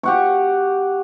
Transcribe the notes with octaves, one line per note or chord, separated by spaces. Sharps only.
G4 F#5 C#6